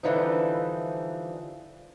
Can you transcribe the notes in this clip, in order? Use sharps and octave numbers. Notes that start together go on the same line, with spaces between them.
D3 E3 F3 G3 D#4